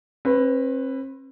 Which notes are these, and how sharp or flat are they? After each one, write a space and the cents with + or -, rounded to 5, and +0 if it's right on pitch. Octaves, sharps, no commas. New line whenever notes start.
C4 +40 B4 +0